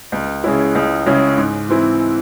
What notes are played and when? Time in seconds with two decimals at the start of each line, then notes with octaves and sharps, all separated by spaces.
0.12 C#2
0.44 C#3 G#3 C#4 E4
0.75 C#2
1.06 C#3 G#3 C#4 E4
1.38 G#2
1.69 E3 C4 E4